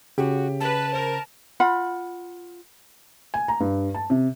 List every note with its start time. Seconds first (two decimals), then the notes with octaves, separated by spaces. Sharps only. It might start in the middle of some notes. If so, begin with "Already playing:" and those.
0.18 C#3 F#4 G4
0.60 B4 A5
0.93 A#4 C5
1.60 F4 F#5 B5
3.34 G#5
3.48 A#5
3.60 G2
3.95 A5
4.10 C3